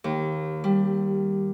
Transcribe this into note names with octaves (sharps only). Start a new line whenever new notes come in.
D#2
G3